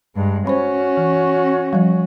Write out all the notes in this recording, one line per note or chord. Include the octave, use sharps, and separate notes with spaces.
G2 G#3
C#4 F#4 C5 B5
E3
F3 G3